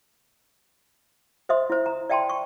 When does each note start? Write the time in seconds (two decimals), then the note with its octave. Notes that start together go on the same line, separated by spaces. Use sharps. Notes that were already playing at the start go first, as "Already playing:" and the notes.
1.49 C5 D#5 E5 C6 D#6
1.70 E4 C5
1.86 A#5
2.10 D5 E5 G5 A5 B5 C6
2.30 C#6